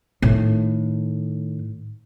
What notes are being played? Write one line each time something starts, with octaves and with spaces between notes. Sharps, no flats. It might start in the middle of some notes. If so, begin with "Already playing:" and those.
A2 D#3